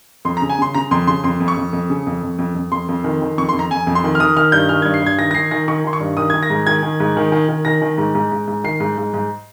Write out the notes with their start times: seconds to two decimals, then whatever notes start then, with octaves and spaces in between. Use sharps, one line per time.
0.25 F2 C6
0.37 A#5
0.42 C#3
0.50 G#5
0.59 C#3 C6
0.75 C#3 A#5
0.91 F2 C6
1.07 C#3 C6
1.24 F2 C6
1.40 F2
1.48 C#6
1.57 F2
1.73 F2
1.90 C#3
2.07 F2
2.23 F2
2.39 F2
2.55 F2
2.72 F2 C6
2.89 F2
3.04 D#3
3.22 D#3
3.38 F2 C#6
3.49 F2 C6
3.59 A#5
3.70 F2 G#5
3.87 F2
3.95 C6
4.04 D#3
4.15 F6
4.20 D#3 D#6
4.36 D#3 F6
4.52 G2 G6
4.69 D#3 F6
4.82 G2 G#6
4.94 C7
5.02 G2 G#6
5.19 D#3 A#6
5.31 A#6
5.34 D#3 C7
5.51 D#3 A#6
5.68 D#3 C#6
5.85 D#3 C6
5.93 C#6
6.00 G2
6.17 D#3 D#6
6.30 D#3 G#6
6.43 A#6
6.50 G#2
6.67 D#3 G#6
6.83 D#3
7.00 G#2
7.17 D#3
7.32 D#3
7.49 D#3
7.65 D#3 A#6
7.82 D#3
7.98 G#2
8.15 G#2
8.32 G#2
8.48 G#2
8.64 D#3 C7
8.80 G#2
8.98 G#2
9.14 G#2